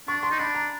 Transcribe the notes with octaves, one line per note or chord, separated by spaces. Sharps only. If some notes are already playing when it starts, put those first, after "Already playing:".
D4 C#6
C6
D#4
D4 B5
A#5